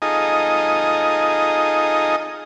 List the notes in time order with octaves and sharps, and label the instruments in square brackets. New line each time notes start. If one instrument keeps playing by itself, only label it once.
[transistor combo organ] D#4 F4 G#4 A4 D#5 A#5